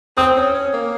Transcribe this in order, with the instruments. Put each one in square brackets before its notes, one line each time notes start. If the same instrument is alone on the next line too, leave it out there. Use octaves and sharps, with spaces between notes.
[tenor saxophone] C4 [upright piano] D#6
[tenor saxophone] C#4
C#4
A#3